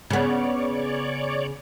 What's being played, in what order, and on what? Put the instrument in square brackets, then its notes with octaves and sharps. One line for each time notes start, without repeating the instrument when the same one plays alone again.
[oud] C#3 B3 [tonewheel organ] C#5 D5